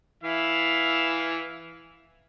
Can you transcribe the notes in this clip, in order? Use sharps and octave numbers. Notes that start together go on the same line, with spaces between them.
E3 E4 F5